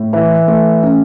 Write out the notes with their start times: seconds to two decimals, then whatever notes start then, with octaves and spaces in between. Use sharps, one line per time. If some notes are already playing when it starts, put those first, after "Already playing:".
Already playing: A2
0.13 E3
0.48 A3
0.83 C#4